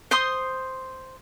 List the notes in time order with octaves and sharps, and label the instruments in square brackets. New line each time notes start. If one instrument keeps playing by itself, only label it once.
[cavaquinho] C5 C6 D#6